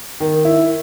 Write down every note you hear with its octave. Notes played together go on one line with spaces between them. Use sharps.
D#3
E4